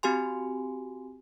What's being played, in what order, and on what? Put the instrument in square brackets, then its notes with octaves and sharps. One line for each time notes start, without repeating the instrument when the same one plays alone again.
[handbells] C4 F#4 G4 G#5 C6